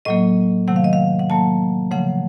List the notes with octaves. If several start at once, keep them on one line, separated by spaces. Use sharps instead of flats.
A2 F#3 A#3 D#5
C3 D#3 F#3 A3 F#5
F5
D#5
F5
F#5
A2 F#3 A#3 A5
C#3 F3 A3 F#5